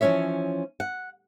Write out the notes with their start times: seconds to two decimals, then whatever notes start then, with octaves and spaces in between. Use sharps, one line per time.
0.01 E3 F3 A#3 C#4 C#5 E5
0.80 F#5